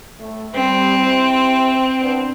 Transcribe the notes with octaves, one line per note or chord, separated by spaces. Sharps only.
A2 A3
G3 C4
E4 G4 C5
B3 D4